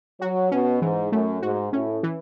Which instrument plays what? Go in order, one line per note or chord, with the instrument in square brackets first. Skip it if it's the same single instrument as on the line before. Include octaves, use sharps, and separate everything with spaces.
[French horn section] F#3 [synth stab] F#4
[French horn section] B2 [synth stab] C#4
[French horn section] G#2 [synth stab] E3
[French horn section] F#2 [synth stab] A3
[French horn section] G#2 [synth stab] F#4
[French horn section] A2 [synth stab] C#4
[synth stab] E3